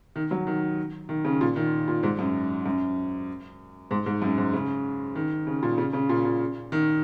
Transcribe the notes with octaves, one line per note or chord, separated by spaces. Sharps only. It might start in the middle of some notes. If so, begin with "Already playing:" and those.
D#3
F#3
D#3
D#3
C#3
A#2
D#3
A#2
G#2
F#2
F#2
G#2
G#2
F#2
G#2
C#3
D#3
C#3
A#2
C#3
C#3
A#2
A#2
D#3